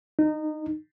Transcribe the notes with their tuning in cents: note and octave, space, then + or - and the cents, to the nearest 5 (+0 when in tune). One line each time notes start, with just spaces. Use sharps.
D#4 -20